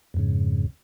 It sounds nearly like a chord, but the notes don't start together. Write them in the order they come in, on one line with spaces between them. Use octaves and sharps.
F2 G#2 C#3